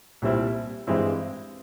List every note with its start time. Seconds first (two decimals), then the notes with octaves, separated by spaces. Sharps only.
0.22 C2 A#2 G3 C4 E4
0.87 G2 E3 G#3 C4 E4